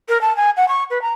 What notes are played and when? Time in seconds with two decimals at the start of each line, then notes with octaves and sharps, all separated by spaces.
0.09 A#4
0.21 A5
0.37 G#5
0.57 F#5
0.68 C#6
0.90 B4
1.02 A#5